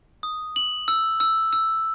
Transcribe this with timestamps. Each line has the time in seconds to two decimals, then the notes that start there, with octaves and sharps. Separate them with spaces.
0.23 D#6
0.56 F#7
0.88 E6
1.20 E6
1.53 E6